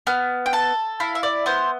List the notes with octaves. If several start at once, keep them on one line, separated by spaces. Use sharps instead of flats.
B3 F6
G5
A4 A5
E4 F5
E5
D5
B3 C5